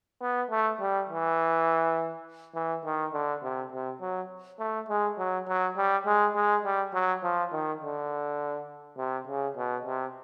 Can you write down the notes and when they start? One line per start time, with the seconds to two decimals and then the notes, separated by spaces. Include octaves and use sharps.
0.22 B3
0.51 A3
0.80 G3
1.09 E3
2.55 E3
2.85 D#3
3.13 D3
3.43 C3
3.72 C3
4.01 F#3
4.59 A3
4.89 G#3
5.18 F#3
5.48 F#3
5.77 G3
6.06 G#3
6.35 G#3
6.64 G3
6.94 F#3
7.23 F3
7.52 D#3
7.82 D3
8.98 C3
9.27 C#3
9.57 B2
9.85 C3